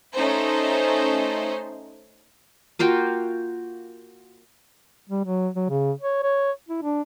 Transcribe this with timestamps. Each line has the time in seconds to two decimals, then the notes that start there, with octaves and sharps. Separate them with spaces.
0.15 A3 C#4 D#4 C5
2.79 A#3 F4 F#4 G5
5.10 G3
5.25 F#3
5.56 F#3
5.70 C#3
6.01 C#5
6.23 C#5
6.69 E4
6.83 D4